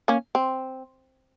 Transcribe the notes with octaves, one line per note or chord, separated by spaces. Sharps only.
A#3 C#4
C4